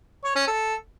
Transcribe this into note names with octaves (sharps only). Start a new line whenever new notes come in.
C#5
C#4
A4